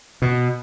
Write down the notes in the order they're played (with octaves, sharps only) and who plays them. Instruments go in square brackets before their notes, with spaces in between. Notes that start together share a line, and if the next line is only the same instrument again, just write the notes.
[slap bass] B2